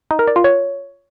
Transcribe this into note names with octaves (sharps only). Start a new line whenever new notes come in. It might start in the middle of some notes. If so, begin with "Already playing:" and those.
D#4
A#4
D5
F4
C#5